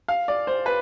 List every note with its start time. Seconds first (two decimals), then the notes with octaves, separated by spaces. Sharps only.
0.08 F5
0.28 D5
0.47 C5
0.66 B4